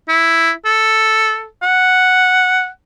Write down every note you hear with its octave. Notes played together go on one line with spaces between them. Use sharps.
E4
A4
F#5